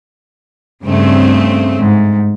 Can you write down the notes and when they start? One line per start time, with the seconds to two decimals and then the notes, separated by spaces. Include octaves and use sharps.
0.84 G2 C#3 A3 C4
1.80 G#2